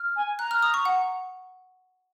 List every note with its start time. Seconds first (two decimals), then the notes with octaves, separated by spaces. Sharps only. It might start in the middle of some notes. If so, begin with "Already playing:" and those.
Already playing: F6
0.16 G#5
0.39 A#5 F#6
0.51 F6
0.62 D#6
0.74 C#6
0.85 F#5